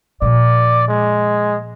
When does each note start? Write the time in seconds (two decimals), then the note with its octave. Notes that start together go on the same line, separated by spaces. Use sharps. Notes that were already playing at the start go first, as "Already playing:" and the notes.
0.22 A#2 F3 D5
0.88 G#3